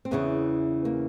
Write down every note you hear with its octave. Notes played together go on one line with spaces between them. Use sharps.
C4
E2 C#3 E3 B3
A#3